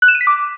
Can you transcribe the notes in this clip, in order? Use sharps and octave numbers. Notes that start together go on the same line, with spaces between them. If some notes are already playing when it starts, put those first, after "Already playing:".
F#6
E7
D#7
B6
D6